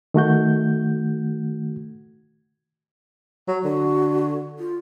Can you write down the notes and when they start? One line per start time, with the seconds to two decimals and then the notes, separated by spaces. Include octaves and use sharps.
0.14 D#3 A3 F#4 G6
3.48 F#3
3.65 D3 F#4
4.59 F4